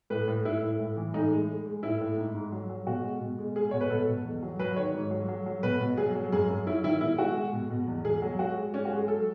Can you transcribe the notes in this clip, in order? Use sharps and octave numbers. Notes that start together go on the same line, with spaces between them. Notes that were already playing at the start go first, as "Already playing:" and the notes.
A2 B4
A2
A2 E4
A2
A2
E3
A2 D#4
G#3
G#3
G#3
A2 E4
A2
G#2
G#2
F#3
F#3
B2 F#4
G#3
B2
G#3
G#3 G#4
B2 C#5
B4
B2 A4
B2
E2
F#3
F#3 B4
D#3 C#5
G#2
F#3
F#3
F#3
B2 B4
B2
F#3 G#4
F#3
F#2 G#4
F#2
F#3 E4
D#3 E4
B2 E4
G#3 F#4
G#3
B2
B2
E2
B2 G#4
F#3
G#3 F#4
G#3
G#3 C#4
F#4
G#3
G#4
F#3 A4